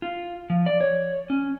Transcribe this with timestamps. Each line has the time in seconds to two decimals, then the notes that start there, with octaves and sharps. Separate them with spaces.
0.02 F4
0.50 F3
0.66 D5
0.81 C#5
1.30 C#4